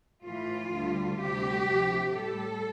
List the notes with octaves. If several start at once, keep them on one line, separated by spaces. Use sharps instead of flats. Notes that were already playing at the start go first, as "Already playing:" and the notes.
A2 E3 A3 F4
D2 D3 G3
D2 C3 G3 G4
D2 C3 F3
A2 G3 A4